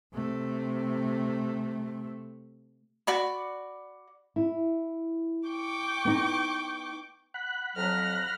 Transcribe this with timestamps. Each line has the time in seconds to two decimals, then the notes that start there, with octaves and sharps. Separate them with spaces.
0.14 C3 A3
3.07 F#4 D5 B5
4.36 E4
5.49 G5 C#6 D6
6.05 B3 D#4
7.34 F#5 B5 F#6
7.76 F2 F#3 F6 A#6